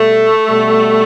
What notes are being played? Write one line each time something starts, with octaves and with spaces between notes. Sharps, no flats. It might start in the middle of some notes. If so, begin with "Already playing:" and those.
Already playing: B2 G3 A3
B2 G3